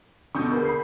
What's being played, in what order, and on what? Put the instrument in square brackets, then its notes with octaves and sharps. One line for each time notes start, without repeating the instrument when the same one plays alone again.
[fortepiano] B2 D3 [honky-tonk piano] C#6 D#6 G6
[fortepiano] A#3 [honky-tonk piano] G#4 B4
[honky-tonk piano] B5 C7